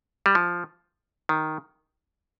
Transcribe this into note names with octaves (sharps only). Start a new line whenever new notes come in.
G3
F3
D#3